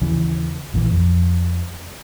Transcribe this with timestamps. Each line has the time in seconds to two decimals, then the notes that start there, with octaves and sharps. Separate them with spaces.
0.02 D#2 C#3 E3
0.74 A#1 A#2 D#3 E3
0.91 F2